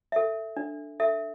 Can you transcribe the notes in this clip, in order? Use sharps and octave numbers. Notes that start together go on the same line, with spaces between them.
A4 E5
D4
A4 E5